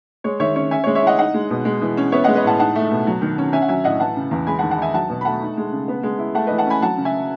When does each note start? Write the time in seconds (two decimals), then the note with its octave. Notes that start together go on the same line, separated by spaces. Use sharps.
0.24 G#3 C#5
0.40 D#3 C#5 E5
0.56 C#4 C#5
0.71 C#4 E5 G#5
0.84 C#5
0.87 G#3
0.95 C#5 E5
1.03 E4 D#5 F#5
1.18 D#4 D#5 F#5
1.34 G#3
1.50 B2
1.65 G#3
1.82 E3
1.97 C#4
2.12 B3 C#5 E5
2.24 D#5 F#5
2.28 G#3
2.35 B4 D#5
2.44 A2 F#5 A5
2.59 D#4 F#5 A5
2.75 A3
2.91 B2
3.07 F#3
3.22 D#3
3.38 C#4
3.53 C#4 E5 G#5
3.62 F#5
3.68 F#3 E5 G#5
3.84 A2 D#5 F#5
4.00 E3 F#5 A5
4.16 C#3
4.31 E2
4.47 G#3 G#5 B5
4.59 F#5 A5
4.62 D#3
4.71 F#5 A5
4.78 D#4 E5 G#5
4.94 F#3 F#5 A5
5.10 B2
5.21 B5
5.25 A3 F#5 A5
5.42 D#4
5.57 G#3
5.72 C#3
5.88 B3
6.03 G#3
6.19 E4
6.34 A3 F#5 A5
6.47 B4 D#5
6.51 E3
6.58 F#5 A5
6.67 C#4 G#5 B5
6.82 F#3 F#5 A5
6.97 C#3
7.05 E5 G#5